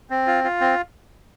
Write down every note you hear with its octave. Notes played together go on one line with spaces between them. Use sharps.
C4
F4
F4
C4